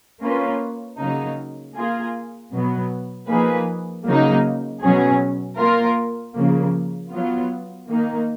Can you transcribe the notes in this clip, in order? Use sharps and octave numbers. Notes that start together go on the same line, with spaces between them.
A#3 C#4 F4 B4
C#3 F#3 A#3 D#4
A#3 F4 G#4
B2 F#3 B3
F3 A#3 D#4 G#4 B4
C#3 F#3 A#3 D#4
B2 F#3 C#4 G#4
A#3 F4 A#4
C#3 F3 A#3
F#3 B3 F4
D#3 A#3 D#4